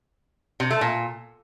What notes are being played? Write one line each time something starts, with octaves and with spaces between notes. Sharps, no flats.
C3
A3
A#2